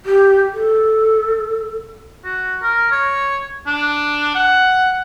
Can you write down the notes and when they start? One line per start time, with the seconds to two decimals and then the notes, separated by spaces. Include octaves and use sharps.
0.05 G4
0.53 A4
2.25 F#4
2.62 A#4
2.92 C#5
3.67 D4
4.35 F#5